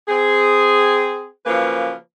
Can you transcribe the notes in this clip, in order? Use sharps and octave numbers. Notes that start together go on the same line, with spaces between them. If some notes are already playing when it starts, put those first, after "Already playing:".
C4 G#4
C#3 F3 F#3 A#3 B4